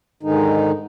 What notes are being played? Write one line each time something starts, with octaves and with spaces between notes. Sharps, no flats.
G#2 D3 D#3 G#3 D#4